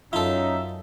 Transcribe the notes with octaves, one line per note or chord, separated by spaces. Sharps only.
F#2 C#4 D#4 F4 A4 E5